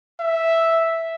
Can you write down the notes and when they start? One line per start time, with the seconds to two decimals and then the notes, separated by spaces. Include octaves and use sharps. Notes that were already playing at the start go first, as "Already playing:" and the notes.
0.20 E5